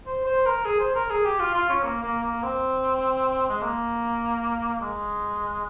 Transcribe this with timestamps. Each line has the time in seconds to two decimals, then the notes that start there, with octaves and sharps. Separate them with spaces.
0.06 C5
0.26 C5
0.46 A#4
0.66 G#4
0.80 C5
0.95 A#4
1.10 G#4
1.25 G4
1.40 F4
1.54 F4
1.70 C#4
1.84 A#3
2.03 A#3
2.23 A#3
2.43 C4
3.49 G#3
3.62 A#3
4.81 G#3